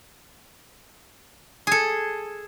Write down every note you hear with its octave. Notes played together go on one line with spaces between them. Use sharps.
G#4 A4